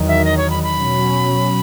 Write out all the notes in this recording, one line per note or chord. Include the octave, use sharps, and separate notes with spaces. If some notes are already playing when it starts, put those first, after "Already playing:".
Already playing: E2 D#3 F#3
E5
D#5
C#5
B5
B5
B2 F#3 C#4